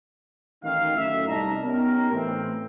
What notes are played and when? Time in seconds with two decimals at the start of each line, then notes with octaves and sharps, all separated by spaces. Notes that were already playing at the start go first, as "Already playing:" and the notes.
0.63 A1 D#3 F5
0.97 F#2 A2 E5
1.28 C2 D#4 D5 D#5 A5 A#5
1.63 B3 C#4 D#4 G4 A#4
2.12 A2 E3 C4